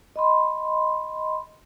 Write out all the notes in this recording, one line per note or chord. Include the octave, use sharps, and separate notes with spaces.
D#5 B5 C6